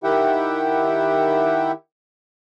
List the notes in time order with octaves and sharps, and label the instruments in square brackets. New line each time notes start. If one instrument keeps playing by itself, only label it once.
[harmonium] D#3 E4 G4 E5 F#5 G5